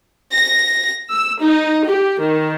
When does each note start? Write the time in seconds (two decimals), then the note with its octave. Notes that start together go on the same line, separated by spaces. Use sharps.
0.33 A#6
1.11 E6
1.42 D#4
1.88 G4
2.20 D#3